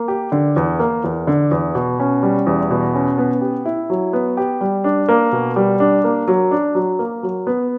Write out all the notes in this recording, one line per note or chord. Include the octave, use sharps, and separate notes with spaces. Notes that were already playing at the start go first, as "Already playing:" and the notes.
Already playing: A#3
G4
D3
E2
A#3
E2
D3
E2
B2
C#4
G3
E2
B2
C#4
B3
G4
E4
F#3
B3
G4
G3
D4
A#3
B2
G3
D4
A#3
F#3
D4
F#3
A#3
F#3
B3